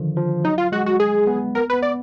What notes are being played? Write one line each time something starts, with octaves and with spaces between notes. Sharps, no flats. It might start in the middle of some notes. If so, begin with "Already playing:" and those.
Already playing: D3 D#3 F3
F3
F#3 D#4
F4
G#3 F#4
F#4
G#4
B3
B3 A#4
B3 B4
D5